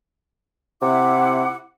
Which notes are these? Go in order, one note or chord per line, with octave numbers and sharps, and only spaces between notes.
C3 E4 F#5 D6